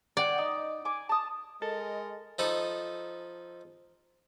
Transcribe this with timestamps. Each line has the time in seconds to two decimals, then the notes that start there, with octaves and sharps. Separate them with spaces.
0.17 C#5 D5 F#5 G5
0.38 D#4
0.85 G#5 D6
1.09 A5 D#6
1.62 G#3 A4 A#4 D#5
2.39 F3 D#4 A4 B5 D#6